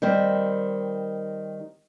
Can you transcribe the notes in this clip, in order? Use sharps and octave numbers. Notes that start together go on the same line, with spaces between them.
D#3 G3 C4